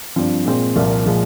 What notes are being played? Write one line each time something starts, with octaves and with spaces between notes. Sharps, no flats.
G2 F3 C4
A#2 G#3 C4
C2 A#2 F3 A#3
A#2 F3 G#3